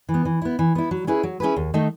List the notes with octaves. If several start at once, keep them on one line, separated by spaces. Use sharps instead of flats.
E3
B3
E3
B3 E4
E3
B3 E4
F#3
C#4 E4 G#4 B4
F#3
C#4 E4 G#4 B4
D#2
D#3 A3 D#4